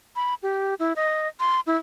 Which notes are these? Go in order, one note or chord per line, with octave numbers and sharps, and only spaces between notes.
B5
G4
E4
D#5
C6
E4